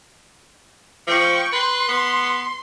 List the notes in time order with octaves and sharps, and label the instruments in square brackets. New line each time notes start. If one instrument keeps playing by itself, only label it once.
[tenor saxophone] F3 [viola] G5 C#6
[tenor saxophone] B4 [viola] C6
[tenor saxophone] B3